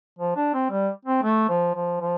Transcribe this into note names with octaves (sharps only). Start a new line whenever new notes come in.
F3
D4
C4
G3
C4
A3
F3
F3
F3